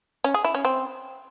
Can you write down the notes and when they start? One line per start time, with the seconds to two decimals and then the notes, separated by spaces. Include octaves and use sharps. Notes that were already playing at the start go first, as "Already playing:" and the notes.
0.24 C#4
0.34 G#4
0.45 E4
0.55 C#4
0.65 C4